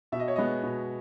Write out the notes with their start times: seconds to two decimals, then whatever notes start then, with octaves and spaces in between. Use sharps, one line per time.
0.12 B2 E5
0.20 D#5
0.28 C#5
0.36 G#3 B3 D#5
0.63 B2